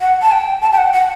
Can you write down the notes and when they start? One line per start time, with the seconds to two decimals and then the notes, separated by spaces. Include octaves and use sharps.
0.01 F#5
0.22 A5
0.32 G5
0.62 A5
0.72 G5
0.78 F#5
0.93 F#5